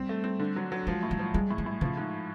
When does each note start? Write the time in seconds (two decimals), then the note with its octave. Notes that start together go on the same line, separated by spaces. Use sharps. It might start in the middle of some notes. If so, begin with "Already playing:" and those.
Already playing: G3 C4
0.09 A3
0.24 C4
0.39 D3
0.56 F#3
0.72 F#3
0.87 F3 G#3
1.03 A2
1.11 G3
1.19 F3
1.34 G3 G#3
1.51 A2
1.58 G3
1.66 A2
1.81 C#3 F3
1.97 G#2